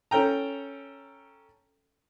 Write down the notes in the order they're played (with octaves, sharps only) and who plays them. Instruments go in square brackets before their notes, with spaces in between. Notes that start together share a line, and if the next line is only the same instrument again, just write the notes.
[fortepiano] C#4 A4 G5 A#5